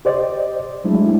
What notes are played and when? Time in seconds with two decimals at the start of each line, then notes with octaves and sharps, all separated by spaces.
0.05 G4 C5 D5 D#5
0.84 F#3 G#3 A3 D4 E4